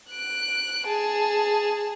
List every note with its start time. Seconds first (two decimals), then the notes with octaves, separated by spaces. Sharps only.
0.11 F#6 D7
0.87 G#4 A5